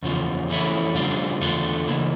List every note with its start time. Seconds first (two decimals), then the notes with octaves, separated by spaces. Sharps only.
0.03 E2 C#3 F3
0.49 F2 E3 A3 C#4 E4
0.95 F2 C#3 G3 D4 F4
1.41 E2 D3 A3 D4 F4
1.88 C#3 E3 A#3 E4